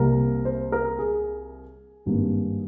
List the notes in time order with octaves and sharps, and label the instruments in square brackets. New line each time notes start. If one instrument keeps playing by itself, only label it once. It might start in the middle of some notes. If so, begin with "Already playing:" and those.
Already playing: [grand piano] C2 C3 G3 A#3 A#4
C5
A#4
G#4
G#1 G2 G3 A#3